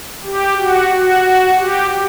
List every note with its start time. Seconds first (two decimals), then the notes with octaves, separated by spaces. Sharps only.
0.24 G4
0.58 F#4
0.91 F#4
1.57 G4